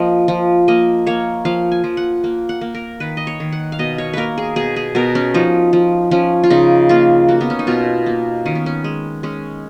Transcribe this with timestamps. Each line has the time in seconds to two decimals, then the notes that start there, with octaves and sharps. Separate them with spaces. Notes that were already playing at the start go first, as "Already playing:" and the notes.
Already playing: F3 A#3 D#5
0.28 F3
0.68 A#3 D#5
1.07 A#3 C#5
1.45 F3 F5
1.72 G#5
1.84 F3
1.97 F#5
2.24 A#3
2.49 F#5
2.61 A#3
2.75 A#4
3.00 D#3 B4
3.17 D#5
3.27 C#5
3.40 D#3
3.52 F#5
3.72 F5
3.79 B2 D#5
3.98 C#5
4.13 A#3 A#4 B4
4.38 G#4
4.56 B2 G#4
4.76 G#4
4.95 B2 A#4
5.15 C#4
5.34 F3 D#4
5.73 F3
6.11 F3 C#4
6.44 F4
6.50 C#3 D#4
6.89 A#3 F4
7.28 A#3 F#4
7.41 B3
7.50 C#4
7.59 D#4
7.67 B2 F4
8.06 A#3
8.46 D#3 C#4
8.55 B3
8.66 C#4
8.84 G#3
9.23 G#3 C#4